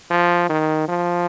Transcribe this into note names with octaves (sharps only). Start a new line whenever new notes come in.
F3
D#3
F3